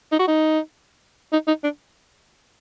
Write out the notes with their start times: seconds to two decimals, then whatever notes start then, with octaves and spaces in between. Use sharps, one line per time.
0.12 D#4
0.19 F#4
0.28 D#4
1.33 D#4
1.47 D#4
1.64 D4